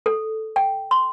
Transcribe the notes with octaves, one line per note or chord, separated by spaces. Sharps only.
A4
G5
C6